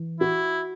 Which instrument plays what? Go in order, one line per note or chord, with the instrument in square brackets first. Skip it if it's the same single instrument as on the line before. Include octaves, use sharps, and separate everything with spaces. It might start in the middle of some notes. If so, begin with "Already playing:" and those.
Already playing: [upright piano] E3
[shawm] E4 [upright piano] F#4